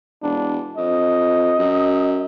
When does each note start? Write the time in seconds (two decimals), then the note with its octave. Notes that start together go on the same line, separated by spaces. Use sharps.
0.23 E1 D4
0.77 F2 D#5
1.58 F#2